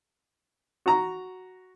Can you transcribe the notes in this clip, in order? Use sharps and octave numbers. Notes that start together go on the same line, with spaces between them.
F#4 A#5